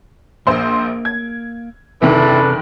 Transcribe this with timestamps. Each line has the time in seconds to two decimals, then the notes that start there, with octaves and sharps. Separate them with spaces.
0.47 A#1 A#3 C5 C6
1.05 G#6
2.02 F#1 E2 C3 D#3 E3 D4 A4 B4